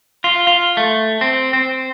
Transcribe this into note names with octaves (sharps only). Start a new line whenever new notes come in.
F4
F4
A3
C4
C4